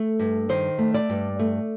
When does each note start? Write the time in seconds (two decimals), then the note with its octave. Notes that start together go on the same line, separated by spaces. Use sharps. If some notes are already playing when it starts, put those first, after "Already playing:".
Already playing: A3
0.19 G2
0.49 D#3 C5
0.78 A3
0.94 D5
1.09 G2
1.39 A3